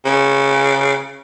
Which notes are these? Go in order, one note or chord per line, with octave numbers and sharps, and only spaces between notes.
C#3